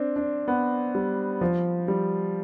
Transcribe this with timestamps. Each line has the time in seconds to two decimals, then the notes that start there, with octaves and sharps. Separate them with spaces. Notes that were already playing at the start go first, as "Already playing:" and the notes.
Already playing: C4 D4
0.16 D4
0.48 B3
0.95 G3
1.41 F3
1.88 G3